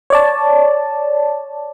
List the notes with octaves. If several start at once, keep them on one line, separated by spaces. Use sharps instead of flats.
C#5 D5 A5